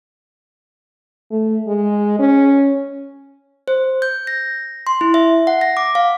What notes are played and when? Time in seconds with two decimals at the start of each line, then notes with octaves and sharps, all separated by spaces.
1.31 A3
1.67 G#3
2.19 C#4
3.68 C5
4.02 G6
4.27 A#6
4.87 C6
5.01 E4
5.14 E5
5.47 F#5
5.61 A#6
5.77 D6
5.95 F5